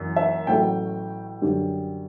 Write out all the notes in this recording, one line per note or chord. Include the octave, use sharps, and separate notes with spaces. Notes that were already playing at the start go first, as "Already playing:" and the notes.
Already playing: F#1 F#2 E3
E5
A1 A2 F#3 A3 G5
F#2 D3 G3